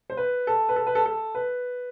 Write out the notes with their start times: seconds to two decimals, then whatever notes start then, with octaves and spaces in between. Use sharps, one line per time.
0.10 C5
0.17 B4
0.47 A4
0.69 B4
0.76 A4
0.87 B4
0.95 A4
1.06 A4
1.35 B4